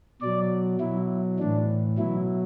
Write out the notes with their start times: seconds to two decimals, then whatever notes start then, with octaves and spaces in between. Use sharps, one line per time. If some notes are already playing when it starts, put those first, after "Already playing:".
0.21 B2 F#3 D5
0.80 B2 F#3 E4
1.39 A2 E3 D4
1.98 B2 F#3 E4